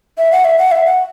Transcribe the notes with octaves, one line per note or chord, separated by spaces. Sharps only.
E5
F#5
E5
F#5
E5
F#5